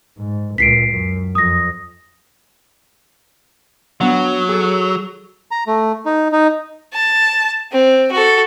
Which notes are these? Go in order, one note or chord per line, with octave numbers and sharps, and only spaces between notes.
G#2
C#2 A#2 B6 C7 D7
F#2
F2 D#6 A#6
F#3 B3 D4 F#5
G#4 A4
A#5
A3
D#4
D#4
A5
C4
F#4 A4